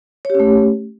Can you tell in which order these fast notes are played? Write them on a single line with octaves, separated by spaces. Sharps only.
C#5 G4 C#4 A3